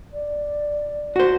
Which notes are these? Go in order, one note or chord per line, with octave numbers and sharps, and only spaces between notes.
D5
F#4 C5